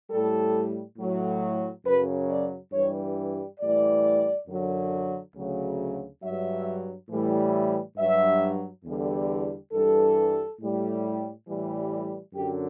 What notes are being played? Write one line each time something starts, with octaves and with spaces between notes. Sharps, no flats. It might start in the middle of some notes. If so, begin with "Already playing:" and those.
A2 G3 A4
A2 F#3
F#2 C#3 F#3 B4
D5
G2 E3 G3 C#5
A2 E3 G3 D5
F#2 D3 F#3
D2 C#3 F#3
G2 F#3 E5
A2 E3 G3
G2 F#3 E5
E2 D3 G3
G2 E3 G3 A4
A2 G3
A2 E3 G3
F#2 D3 F#3 G4